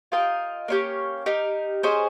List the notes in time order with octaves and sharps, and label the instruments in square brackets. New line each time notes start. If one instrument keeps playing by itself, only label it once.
[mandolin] F4 A#4 D#5 G5
A#3 C#4 G4 C#5
D#4 G4 A#4
C#4 G#4 C5 D#5